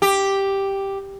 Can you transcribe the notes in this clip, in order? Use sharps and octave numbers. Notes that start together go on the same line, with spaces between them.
G4